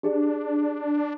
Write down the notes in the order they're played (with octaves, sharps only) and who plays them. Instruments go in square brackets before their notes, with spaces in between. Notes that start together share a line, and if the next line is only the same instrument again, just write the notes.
[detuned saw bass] D4 [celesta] G4 G#4 D5